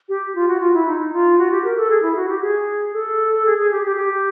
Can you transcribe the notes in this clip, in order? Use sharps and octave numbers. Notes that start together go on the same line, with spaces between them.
G4
F4
F#4
F4
E4
D#4
F4
F#4
G4
A#4
A4
G#4
E4
F#4
G4
G#4
A4
G#4
G#4
G4
G4
G4